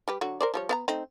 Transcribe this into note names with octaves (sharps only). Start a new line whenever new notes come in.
G3 G4 B4
D3 F#3 F#4
A#4 C5 D5
F3 G3 C#5
B3 F5 A#5
A3 C4 D#4